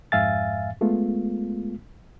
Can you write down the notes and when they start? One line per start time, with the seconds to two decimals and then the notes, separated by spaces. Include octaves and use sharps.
0.12 F2 G#2 E5 F5 G#5 A6
0.81 G#3 A3 B3 F4